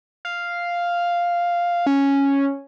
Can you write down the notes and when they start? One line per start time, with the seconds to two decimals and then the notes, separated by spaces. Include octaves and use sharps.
0.25 F5
1.87 C#4